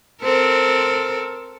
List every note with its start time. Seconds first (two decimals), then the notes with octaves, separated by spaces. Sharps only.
0.23 C4 A4 A#4